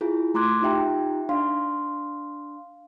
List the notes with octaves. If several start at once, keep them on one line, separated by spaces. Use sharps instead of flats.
E4 F4 G#4
A3 A#5 C6 D6 F#6 G#6
D#4 F4 G4 E5 G5 A#5
D4 F5 C6